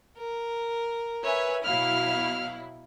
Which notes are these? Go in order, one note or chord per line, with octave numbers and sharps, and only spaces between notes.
A#4
B4 C#5 E5 G#5
B2 F#3 E4 F5 F6